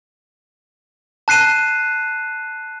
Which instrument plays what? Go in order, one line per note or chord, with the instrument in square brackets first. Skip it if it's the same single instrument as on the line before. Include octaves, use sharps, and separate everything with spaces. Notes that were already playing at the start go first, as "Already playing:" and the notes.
[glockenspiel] A5 F#6 C7 D#7 E7